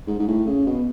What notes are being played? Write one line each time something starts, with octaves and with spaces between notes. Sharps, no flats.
G#2
G#2
A2
C#3
B2